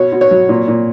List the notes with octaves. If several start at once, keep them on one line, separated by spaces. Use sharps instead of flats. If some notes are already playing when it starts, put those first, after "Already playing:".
Already playing: B2 C#5
B2
C#5
F#3
A#2
A#2